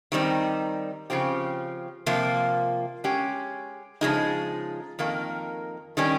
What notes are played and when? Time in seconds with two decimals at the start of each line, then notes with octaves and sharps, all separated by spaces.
0.12 D#3 G3 C4 D#4
1.10 C#3 F3 C4 G4
2.06 C3 F3 A#3 F4
3.04 G#3 C#4 G4
4.01 C#3 F3 G#3 D#4
4.99 F2 D#3 A#3
5.97 D#3 G3 C#4